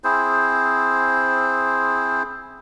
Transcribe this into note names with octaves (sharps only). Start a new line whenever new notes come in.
C4 E4 G#4 C5